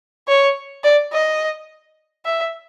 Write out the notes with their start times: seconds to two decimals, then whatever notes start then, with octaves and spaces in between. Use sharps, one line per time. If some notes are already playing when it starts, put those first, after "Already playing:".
0.28 C#5
0.84 D5
1.12 D#5
2.25 E5